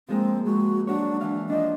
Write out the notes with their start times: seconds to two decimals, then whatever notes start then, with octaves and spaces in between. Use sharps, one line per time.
0.08 F3 G#3 A#3 C4
0.45 G#3 F#4
0.87 F#3 D4 F#4 C#5
1.21 E3 D4 F5
1.49 F3 D4 D#5